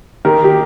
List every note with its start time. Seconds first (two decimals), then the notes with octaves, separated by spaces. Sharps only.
0.25 D#3 G4 A#4
0.44 G4